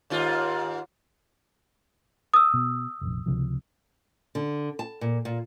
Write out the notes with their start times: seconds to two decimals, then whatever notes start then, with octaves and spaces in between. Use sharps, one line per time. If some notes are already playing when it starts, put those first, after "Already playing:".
0.10 D#2 G#2 F4
2.34 D#6 E6
2.54 B2
3.01 F1 A#1
3.26 C#2 C3 F3
4.35 D3
4.79 A5
5.01 A#2
5.25 A#2